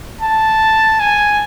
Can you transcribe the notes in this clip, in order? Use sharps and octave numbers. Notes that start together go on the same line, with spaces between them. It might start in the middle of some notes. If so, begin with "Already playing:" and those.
A5
G#5